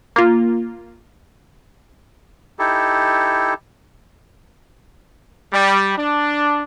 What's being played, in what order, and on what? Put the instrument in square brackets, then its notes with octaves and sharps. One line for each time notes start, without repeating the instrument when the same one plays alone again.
[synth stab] A#3 F4
[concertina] D#4 E4 G4 A4
[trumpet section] G3
D4